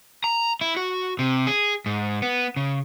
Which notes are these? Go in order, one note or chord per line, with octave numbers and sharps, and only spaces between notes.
A#5
E4
F#4
C3
G#4
G#2
B3
C#3